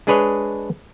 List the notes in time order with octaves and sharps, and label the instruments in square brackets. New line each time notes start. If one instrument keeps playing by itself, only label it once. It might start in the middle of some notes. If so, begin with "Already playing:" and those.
[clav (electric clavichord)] G#3 D4 G#4 B4 C#5 D#5